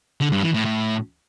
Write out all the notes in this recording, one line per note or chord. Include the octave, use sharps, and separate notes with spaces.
D3
G2
E3
A2
A2